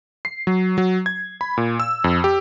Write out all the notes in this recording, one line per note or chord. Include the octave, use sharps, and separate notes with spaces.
C7
F#3
F#3
G#6
B5
A#2
E6
F2
G4